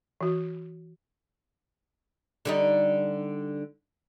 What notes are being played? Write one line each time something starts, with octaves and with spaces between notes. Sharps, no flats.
E3 F#4
D3 G3 D#4